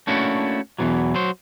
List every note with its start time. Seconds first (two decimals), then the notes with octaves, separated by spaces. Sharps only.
0.07 A3 A#3 C#4 D4 E4 F#4
0.78 E2 G2 B2 E3 F#3
1.15 F#3 C5